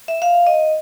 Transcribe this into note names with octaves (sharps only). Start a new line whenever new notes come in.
E5
F5
D#5